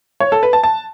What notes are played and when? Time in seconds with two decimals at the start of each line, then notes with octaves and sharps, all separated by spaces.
0.20 C#5
0.32 A4
0.43 B4
0.53 A5
0.63 A5